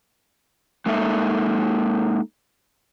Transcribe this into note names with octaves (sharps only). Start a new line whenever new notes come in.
G#3 A#3 D#4 A4 E5